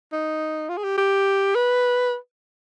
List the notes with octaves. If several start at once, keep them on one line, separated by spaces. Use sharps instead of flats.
D#4
F4
G#4
G4
G4
B4